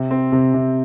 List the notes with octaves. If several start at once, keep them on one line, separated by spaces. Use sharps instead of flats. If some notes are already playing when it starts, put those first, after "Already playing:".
Already playing: C3
C4
C3
C3